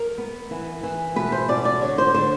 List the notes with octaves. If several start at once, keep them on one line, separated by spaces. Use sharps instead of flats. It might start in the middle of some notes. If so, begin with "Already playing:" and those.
Already playing: A#4
B3
E3
E3
B2 B4
C5
B2 D5
D5
D3 C#5
C5
D3 C5